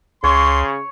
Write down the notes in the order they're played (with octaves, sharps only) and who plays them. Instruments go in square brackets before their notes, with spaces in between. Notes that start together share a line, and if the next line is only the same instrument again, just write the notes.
[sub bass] C#2 [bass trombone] C#3 [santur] C#5 [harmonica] C6